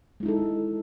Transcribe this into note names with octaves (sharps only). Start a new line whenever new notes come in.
G#3 D#4 E4 A4